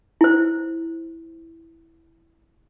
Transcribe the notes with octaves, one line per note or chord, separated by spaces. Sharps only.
E4 C5